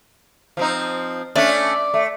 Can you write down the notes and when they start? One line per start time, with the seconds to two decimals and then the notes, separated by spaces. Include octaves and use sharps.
0.57 F3 C4 D#4
1.36 A3 C#4 D4 D5
1.94 A3